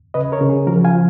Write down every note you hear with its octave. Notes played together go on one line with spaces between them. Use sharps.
C#3 B4 D#5
A#4 C#5
C#3
G#4
F3 F#4 A#4
F5 G#5
F3